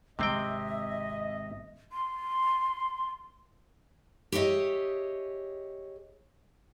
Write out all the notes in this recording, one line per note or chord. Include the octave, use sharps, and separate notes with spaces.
G#1 C3 G#3 C4 D#5 E5 G5
C6
G4 G#4 C#5 D#5 E5